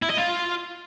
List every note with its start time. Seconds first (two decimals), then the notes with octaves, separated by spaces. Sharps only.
0.03 E4
0.10 D#5
0.18 F4